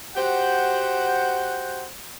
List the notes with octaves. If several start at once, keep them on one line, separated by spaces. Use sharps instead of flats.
F#4 G4 C5 F#5